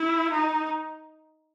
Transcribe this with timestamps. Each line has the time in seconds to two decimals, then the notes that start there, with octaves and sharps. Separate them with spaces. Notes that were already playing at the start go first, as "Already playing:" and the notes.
Already playing: E4
0.31 D#4